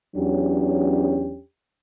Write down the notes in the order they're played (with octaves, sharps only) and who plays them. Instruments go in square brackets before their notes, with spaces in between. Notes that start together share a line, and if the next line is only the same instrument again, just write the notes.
[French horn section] E2 F#3 C#4 D4 G4